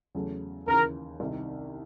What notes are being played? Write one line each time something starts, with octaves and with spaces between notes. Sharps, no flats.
E2 C#3 F#3 A3
D#2 C#3 E3 A#4
C2 C3 D#3